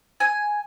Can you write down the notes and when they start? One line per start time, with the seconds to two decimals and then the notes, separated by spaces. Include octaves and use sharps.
0.20 G#5